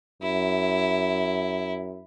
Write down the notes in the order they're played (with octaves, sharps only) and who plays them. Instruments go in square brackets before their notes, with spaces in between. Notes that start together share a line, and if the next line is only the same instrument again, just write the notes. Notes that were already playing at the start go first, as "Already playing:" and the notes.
[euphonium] F#2 [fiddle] E4